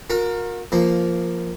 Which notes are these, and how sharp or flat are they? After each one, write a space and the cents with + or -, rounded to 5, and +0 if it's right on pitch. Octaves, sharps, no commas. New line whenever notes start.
F#4 -45 A#4 +0
F3 -10 A#3 +0